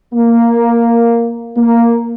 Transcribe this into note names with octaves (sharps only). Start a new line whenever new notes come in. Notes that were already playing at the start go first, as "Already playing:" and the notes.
A#3
A#3